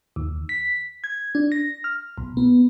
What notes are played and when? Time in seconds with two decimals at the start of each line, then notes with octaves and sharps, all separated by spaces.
0.16 D#2
0.49 B6
1.04 G#6
1.35 D4
1.52 A#6
1.84 F6
2.18 B1
2.37 B3